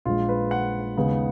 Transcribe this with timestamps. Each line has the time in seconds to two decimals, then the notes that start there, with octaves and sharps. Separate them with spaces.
0.05 A#1 A#2 G#3 F4
0.29 B4
0.51 F#5
0.96 D#2 C#3 G#3 B3